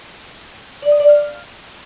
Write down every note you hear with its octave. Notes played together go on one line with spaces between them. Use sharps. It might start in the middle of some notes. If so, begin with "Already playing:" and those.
D5
D#5
D5
F5